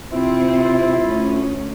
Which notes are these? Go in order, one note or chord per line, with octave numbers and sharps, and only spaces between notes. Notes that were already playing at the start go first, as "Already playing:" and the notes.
C3 C4 E4 F4
D2 C#4